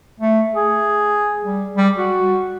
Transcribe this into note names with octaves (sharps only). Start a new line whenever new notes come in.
A3
G#4
G3
G3
F#4